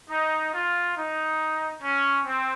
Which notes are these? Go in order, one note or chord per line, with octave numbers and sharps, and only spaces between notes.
D#4
F4
D#4
C#4
C4